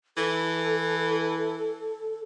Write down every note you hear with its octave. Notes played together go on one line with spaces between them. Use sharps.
E3 A4